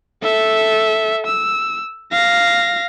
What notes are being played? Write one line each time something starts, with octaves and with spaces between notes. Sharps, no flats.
A4 E5
E6
F5 A#6